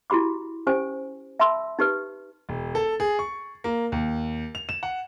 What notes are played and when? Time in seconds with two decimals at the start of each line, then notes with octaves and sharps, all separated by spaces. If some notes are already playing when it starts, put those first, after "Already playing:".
0.10 E4 F#4 G4 B5 D6
0.67 C#4 G4 C5 G#5
1.40 E5 A5 B5 C6 E6
1.79 D#4 G4 B4
2.49 E1
2.75 A4
3.00 G#4
3.19 C#6
3.64 A#3
3.92 D#2
4.55 F7
4.69 E7
4.83 F#5